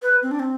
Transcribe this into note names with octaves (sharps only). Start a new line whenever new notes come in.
B4
C4
D4
C4